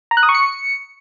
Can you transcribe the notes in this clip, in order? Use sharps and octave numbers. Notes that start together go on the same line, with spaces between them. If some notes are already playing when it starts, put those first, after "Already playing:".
A#5
F#6
D#6
C#6
C#7